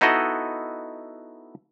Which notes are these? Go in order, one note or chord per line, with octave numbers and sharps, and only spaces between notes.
B3 D#4 E4 F#4 A4 D#5